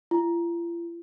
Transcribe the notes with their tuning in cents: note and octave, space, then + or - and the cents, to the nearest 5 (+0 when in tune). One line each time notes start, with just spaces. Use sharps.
F4 -45